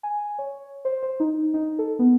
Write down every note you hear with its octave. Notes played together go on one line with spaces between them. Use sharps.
G#5
C#5
C5
C5
D#4
D#4
A4
B3